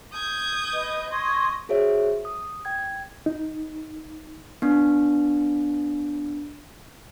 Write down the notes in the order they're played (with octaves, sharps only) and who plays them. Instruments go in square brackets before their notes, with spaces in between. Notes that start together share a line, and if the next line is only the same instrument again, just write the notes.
[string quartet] D#6 G6 G#6
[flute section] B4 D#5
[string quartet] D#5 [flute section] C6 C#6 G#6
[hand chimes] F#4 G#4 C5 C#5 E5
D#6
G5 G#6
[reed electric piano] D#4
[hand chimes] B3 D4